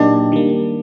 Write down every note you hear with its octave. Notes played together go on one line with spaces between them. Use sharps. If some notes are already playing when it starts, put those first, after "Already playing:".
Already playing: A#2 F#3 A#3 D4 D#4 G4
D#3 G3 A#3